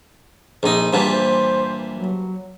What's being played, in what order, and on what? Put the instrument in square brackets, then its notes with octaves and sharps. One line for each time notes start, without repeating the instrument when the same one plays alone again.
[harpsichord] A#1 D#4
G2 A#2 E3
[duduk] C5
F#3